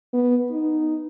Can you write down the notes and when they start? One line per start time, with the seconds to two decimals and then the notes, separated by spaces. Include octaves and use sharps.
0.13 B3
0.51 D#4